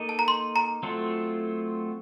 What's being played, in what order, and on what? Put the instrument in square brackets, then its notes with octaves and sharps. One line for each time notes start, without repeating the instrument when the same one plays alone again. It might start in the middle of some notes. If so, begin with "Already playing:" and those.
Already playing: [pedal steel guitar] A#3 D#4 A4 D#5
[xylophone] A5
A#5
C6
A#5
[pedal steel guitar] F#3 A3 C4 F4 A4